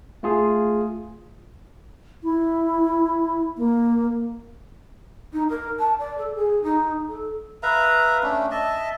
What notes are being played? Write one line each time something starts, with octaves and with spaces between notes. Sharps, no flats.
A3 F4 G#4
E4
A#3
D#4
A#4
A5
D5
A4
G#4
D#4
A4
B4 E5 F5 A#5
A3 C#4 D4
D#5 E5 A5